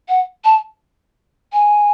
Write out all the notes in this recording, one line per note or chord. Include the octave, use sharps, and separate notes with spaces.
F#5
A5
G#5